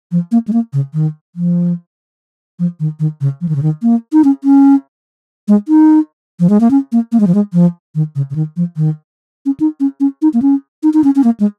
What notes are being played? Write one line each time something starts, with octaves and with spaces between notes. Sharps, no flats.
F3
A#3
G#3
A#3
C#3
D#3
F3
F3
D#3
D#3
C#3
F3
D#3
C#3
D#3
A#3
D#4
C#4
C#4
G#3
D#4
F3
G#3
A#3
C#4
A#3
A#3
G#3
F3
G#3
F3
D#3
C#3
C#3
D#3
F3
D#3
C#4
D#4
C#4
C#4
D#4
A#3
C#4
D#4
D#4
C#4
C#4
A#3
G#3